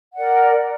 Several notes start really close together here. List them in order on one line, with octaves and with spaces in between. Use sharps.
F#5 D5 A#4